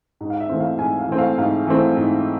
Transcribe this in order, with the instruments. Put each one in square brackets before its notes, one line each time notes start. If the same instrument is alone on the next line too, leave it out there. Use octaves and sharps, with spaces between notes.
[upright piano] G#2
F5
E5
E3 A3 C4
F5
G#2 G#5
F5
E3 A3 C4
F5
G#2 F5
E3 A3 C4
G#2